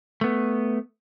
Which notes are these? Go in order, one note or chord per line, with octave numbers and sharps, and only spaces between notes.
A3 B3